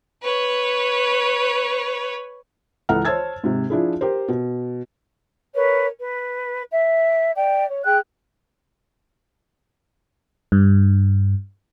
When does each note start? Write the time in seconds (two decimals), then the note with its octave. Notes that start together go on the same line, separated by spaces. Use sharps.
0.23 B4 C#5
2.89 C#2 E3 A4 F#5 A#5 F6
3.05 C5 C#5 A5 E6 G#6 A6
3.44 G#2 C3
3.70 F3 D4 E4 G#4
4.01 G4 A#4 C5
4.29 B2
5.54 A#4 B4 C#5
6.00 B4
6.72 E5
7.36 D5 G5
7.68 C#5
7.85 G#4 G5 F#6
10.52 G2